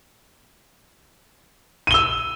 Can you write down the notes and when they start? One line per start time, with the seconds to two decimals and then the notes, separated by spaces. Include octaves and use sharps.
1.87 D#7
1.91 G7
1.94 E6